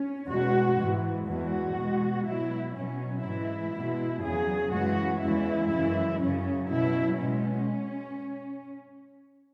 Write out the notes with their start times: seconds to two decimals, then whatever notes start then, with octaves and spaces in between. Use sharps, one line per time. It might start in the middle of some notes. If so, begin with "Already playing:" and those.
Already playing: C#4
0.28 E2 B2 G#3 F#4
0.77 G#2 E3 G#3
1.26 E2 E3 G#3 F#4
1.76 B2 G#3
2.26 B2 F#3 E4
2.74 B2 F#3 C#4
3.24 G#2 E3 G#3 E4
3.74 B2 G#3
4.23 E2 C#3 F#3 G#4
4.73 F#2 C#3 E3 G#3 F#4
5.22 E2 C#3 E3 G#3 E4
5.71 F#2 C#3 E3 G#3
6.21 F#2 C#3 F#3 C#4
6.70 B2 F#3 E4
7.19 B2 G#3 C#4